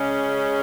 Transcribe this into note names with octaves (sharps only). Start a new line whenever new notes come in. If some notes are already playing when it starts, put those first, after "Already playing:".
Already playing: C#3 G#3 C#4